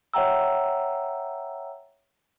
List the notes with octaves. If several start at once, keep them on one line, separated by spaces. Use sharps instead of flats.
C#5 E5 F#5 G5 A#5 E6